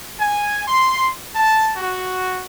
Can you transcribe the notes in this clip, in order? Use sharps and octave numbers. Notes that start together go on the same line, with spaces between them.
G#5
C6
A5
F#4